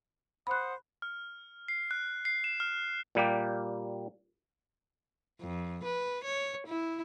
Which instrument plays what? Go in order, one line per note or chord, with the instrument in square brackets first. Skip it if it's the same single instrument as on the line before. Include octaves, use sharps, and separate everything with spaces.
[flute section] C5 F#5 D#6 [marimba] B5 F#6
[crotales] F6
C7
F#6
C7
E7
F6
[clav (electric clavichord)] A#2 G3 A#3 G4
[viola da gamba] F2
B4
C#5
E4